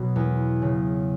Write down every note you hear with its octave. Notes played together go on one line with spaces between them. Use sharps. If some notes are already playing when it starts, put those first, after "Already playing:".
Already playing: B1 B2
E2
C#3